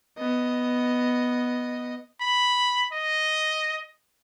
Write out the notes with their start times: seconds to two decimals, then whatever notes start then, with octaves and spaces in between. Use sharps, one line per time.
0.18 B3 D#5
2.21 B5
2.92 D#5